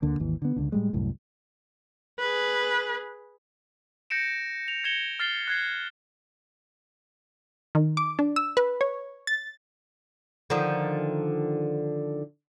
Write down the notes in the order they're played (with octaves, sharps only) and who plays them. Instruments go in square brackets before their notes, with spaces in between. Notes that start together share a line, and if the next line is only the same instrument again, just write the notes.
[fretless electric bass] D2 D3 A#3
G#1 D#2 E3
D3 B3
C#2 D3
A2 G3 G#3
C2 F#2 A2
[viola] G#4 B4
[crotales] G6 A#6 C#7 D7 E7
F7
G#6 A#6 C#7 E7 G7
F6 A6 C7 G7
F#6 G#6 C7
[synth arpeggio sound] D#3
D6
D4
E6
B4
C#5
A6
[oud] D3 D#3 F3